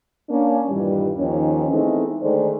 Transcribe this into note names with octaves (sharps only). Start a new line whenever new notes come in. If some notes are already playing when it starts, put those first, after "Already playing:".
A#3 C#4 D4
G2 A#2 D#3 E3 G3
D#2 D#3 F3 C#4
E3 G#3 A3 B3 C4 D#4
D3 D#3 G#3 A3 C5 D5